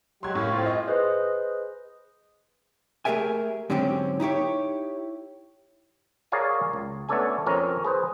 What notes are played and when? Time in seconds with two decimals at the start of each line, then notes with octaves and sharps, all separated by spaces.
0.23 F#3 G#3 G4 C6 G#6
0.35 A2 A#3 C#4
0.52 C4 F4
0.66 G#3 D#5
0.87 G#4 B4 C5 D#5
3.05 A3 G4 G#4 A#4 E5 G#5
3.70 G#2 D3 F#3 C4 C#4 G4
4.20 D#4 E4 G4 C#5
6.32 G#4 A#4 C#5 D5 F5 G#5
6.73 C#2
7.09 A3 B3 C#4 D4 A4 G#5
7.46 F2 C4 C#4 A#4
7.85 G#4 B4 C5